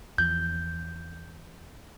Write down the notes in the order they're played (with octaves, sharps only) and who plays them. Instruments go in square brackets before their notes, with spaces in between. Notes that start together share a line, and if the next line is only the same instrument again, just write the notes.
[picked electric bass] E2 F3 [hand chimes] G6